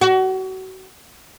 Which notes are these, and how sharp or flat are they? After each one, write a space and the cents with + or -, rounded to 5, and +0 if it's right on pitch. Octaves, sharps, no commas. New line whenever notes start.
F#4 +30